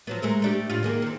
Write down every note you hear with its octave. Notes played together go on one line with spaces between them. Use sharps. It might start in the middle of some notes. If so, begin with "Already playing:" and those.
F3 F#3 B3
G#3 A3 A#4
A3 D4 G4
A2 F4
D#3 A#3 G#4
D#3 C4